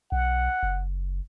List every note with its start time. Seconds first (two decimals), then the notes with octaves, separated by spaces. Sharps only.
0.12 B1 F#5
0.63 F#1